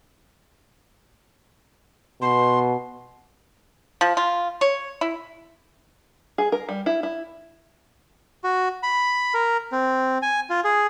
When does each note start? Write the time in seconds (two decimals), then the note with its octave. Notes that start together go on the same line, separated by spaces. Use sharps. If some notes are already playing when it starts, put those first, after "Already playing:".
2.22 B2 C6
4.01 F3
4.17 F4
4.61 C#5
5.01 E4
6.38 G#4
6.52 A#4
6.69 G3
6.86 E4
7.03 E4
8.44 F#4
8.83 B5
9.34 A#4
9.72 C4
10.22 G#5
10.50 F4
10.64 G#4